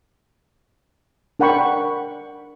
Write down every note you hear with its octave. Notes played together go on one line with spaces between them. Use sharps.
D4 A#4 F#5 G5 B5 C#6